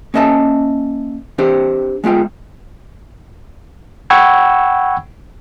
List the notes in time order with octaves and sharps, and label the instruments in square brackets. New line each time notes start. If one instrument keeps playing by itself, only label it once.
[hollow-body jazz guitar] A#3 C#4 D#5 E5 A5
C4 D4 G4 C5
G#3 B3 F4 G5
[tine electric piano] F#5 G5 B5 C#6 E6 G#6